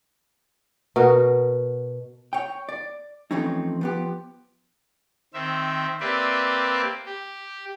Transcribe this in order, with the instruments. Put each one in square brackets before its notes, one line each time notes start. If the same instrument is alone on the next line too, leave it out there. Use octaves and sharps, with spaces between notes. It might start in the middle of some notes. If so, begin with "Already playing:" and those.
[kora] B2 F#4 A#4
[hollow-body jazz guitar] C#5 G5
D5
E3 F3 A3 C4 C#4 D#4
F3 B3 G4
[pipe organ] D#3 C4 E5
A#3 C4 G4 B4 D5 E5
G4